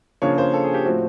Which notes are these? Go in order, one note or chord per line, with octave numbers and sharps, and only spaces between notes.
C#3 F3 A#3 D4 C#5
C5
A4
G#4
G4
A2 F3 A3 C4 F#4